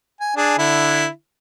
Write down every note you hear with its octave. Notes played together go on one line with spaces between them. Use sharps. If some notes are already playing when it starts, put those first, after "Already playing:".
G#5
D4 G#4
D3 E4